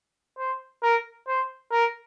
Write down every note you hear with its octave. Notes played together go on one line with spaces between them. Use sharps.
C5
A#4
C5
A#4